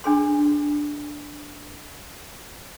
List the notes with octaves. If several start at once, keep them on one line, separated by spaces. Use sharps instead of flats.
D4 G#4 C6